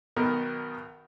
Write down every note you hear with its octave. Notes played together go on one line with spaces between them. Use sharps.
B1 B2 D#3 B3 A#4